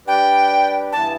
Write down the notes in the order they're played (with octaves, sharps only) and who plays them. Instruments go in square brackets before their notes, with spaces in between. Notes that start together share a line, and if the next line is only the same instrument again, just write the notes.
[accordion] G3 D4 G4 B4 D5 [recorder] G5
[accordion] G2 E3 B3 E4 [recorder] A5